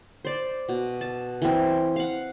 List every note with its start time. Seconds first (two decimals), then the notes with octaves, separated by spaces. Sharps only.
0.25 C5 D5
0.69 B2
1.01 A5
1.42 E3 C4
1.96 F5 F#5